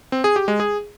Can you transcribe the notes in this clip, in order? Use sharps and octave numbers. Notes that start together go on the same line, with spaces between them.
C4
G#4
G4
G#3
G#4